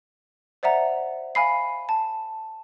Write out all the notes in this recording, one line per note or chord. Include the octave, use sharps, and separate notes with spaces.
C5 D5 E5 F#5 A#5
F5 G#5 B5 C7
A5